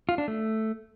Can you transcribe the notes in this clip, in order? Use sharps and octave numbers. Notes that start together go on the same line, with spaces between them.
F4
D4
A3